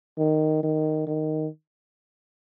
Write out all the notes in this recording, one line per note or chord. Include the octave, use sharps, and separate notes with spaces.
D#3
D#3
D#3